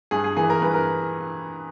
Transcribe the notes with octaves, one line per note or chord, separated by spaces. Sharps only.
G2 G#4
G#4
E3 A#3 G#4
A#4
G2 B4
A#4